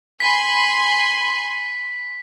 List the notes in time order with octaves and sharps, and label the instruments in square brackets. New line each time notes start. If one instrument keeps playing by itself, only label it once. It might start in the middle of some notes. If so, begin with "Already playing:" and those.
[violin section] G#5 B5 C6 [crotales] B6